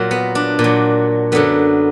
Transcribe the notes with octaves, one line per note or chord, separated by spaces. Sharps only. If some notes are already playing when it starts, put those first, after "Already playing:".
Already playing: A#2 F#3
B3
D4
A#2
F#3
F#2 D3 F#3 B3